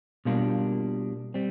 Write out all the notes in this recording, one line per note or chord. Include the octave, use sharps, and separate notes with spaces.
B2 G3 A#3 D4 F4
G3 C4